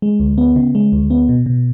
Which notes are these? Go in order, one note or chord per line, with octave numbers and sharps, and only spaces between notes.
G#3
D2
B3
C#3
G#3
D2
B3
B2
B2